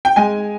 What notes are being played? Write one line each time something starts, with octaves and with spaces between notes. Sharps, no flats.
G5
G#3 G#5